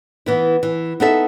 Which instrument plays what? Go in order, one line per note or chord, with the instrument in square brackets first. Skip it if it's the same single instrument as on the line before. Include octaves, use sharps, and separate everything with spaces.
[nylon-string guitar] E3 B3 E4
E3
B3 D#4 A4 E5